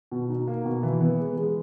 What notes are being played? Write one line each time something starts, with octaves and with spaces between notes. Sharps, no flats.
B2
D#4
A#3
B2
E3
B3
G#3
G#3